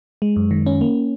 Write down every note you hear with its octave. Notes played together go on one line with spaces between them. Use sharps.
G#3
F#2
D#3
C#4
A#3